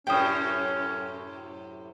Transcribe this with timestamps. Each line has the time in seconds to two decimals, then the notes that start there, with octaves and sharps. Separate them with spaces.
0.07 F#2 A2 C3 C#4 G5 D#6